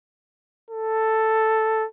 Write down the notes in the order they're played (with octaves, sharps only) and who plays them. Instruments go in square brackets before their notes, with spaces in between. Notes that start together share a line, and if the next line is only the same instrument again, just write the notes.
[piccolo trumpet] A4